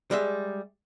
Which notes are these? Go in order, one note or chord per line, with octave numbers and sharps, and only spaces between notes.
G3 G#3 E5